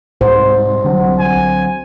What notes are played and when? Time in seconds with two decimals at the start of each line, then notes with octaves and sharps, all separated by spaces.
0.21 C2 G#2 C5
0.84 D3 F#3 C4
1.19 G#5